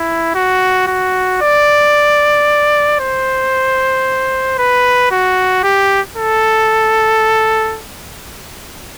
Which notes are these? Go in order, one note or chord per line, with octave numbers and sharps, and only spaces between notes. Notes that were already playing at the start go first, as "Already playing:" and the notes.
Already playing: E4
F#4
F#4
D5
C5
B4
F#4
G4
A4